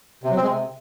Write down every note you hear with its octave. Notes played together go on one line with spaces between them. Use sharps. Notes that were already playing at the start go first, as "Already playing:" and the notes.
C3
F#3
C4
G#3
C3